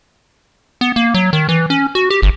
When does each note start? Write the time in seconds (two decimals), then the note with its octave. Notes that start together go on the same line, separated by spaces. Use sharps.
0.81 B3
0.96 A#3
1.14 F#3
1.33 D#3
1.49 E3
1.70 C#4
1.95 F#4
2.10 G4
2.22 G1